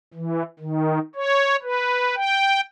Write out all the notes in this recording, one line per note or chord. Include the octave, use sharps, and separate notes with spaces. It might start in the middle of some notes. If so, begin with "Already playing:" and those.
E3
D#3
C#5
B4
G5